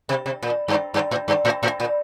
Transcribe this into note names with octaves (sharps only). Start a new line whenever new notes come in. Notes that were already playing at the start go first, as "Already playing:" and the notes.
C3
C3
A#2
G2
G2
A2
G2
A2
A2
A#2